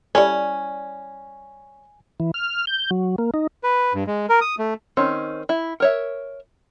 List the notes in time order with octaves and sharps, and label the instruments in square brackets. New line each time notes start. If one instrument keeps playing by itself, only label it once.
[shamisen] G3 E4 A4 [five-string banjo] C#4 [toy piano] D5 [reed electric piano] G#5
[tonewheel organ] E3
F6
G6
F#3
A#3
D#4
[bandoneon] B4
G2
G#3
A#4
D#6
A3
[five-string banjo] D#3 C4 C#4 D#4
E4
A#4 C#5 E5